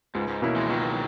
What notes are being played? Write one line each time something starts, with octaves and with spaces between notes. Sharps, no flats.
C#2 G#2
G#2
B2 A#3 C#4 E4
E3 G#3
C#2 D#3 F#3